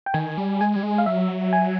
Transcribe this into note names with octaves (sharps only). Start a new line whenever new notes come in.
G5
D#3 G#5
G3
G#3 G#5
G3
G#3
F5
F#3 E5
G#5